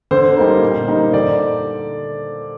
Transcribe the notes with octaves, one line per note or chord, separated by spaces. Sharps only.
D3 C5
G3 A#3 D#4
A#2
G3 A#3 D#4
D3 D5